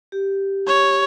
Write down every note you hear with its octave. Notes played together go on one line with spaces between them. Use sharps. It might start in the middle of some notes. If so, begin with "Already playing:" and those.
G4
C#5